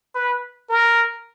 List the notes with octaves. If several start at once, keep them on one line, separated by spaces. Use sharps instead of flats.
B4
A#4